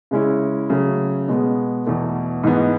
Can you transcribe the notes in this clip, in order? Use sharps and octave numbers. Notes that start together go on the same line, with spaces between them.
C#3 G#3 C#4 E4
C#3 F#3 A3 C#4
B2 G#3 B3
E2 B2 A3
G#2 E3 G#3 B3 D#4